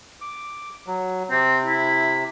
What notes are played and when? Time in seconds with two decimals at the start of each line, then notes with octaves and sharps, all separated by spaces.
0.21 D6
0.87 F#3
1.31 C3 C4
1.65 E4